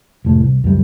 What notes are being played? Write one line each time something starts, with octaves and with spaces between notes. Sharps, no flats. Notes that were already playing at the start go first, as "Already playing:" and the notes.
F1 A2
C2
C#2 F#2 G3